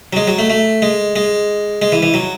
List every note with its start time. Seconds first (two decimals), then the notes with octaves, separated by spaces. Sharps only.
0.13 F#3
0.16 G#3
0.27 F#3
0.39 A3
0.50 A3
0.82 G#3
1.16 G#3
1.82 G#3
1.92 E3
2.03 E3
2.14 F#3